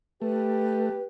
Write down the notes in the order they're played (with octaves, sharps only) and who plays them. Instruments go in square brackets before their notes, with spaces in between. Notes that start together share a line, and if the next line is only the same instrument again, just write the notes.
[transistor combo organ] A3 [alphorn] G4 [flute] B4